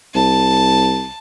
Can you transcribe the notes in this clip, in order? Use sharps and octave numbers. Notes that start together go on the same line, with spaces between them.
C2 A5